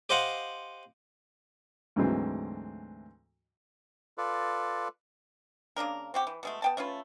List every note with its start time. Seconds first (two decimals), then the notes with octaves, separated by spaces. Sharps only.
0.09 G4 C5 D#5 F5 F#5
1.96 D2 G#2 E3 F#3 C4 C5
4.18 F4 A4 B4 D5
5.76 C#3 A#3 D4 A#4
6.14 C4 F#4 G4
6.27 E3
6.43 B2 G#3 A3
6.62 B3 G5 A5
6.77 A3 C#4 F4 B4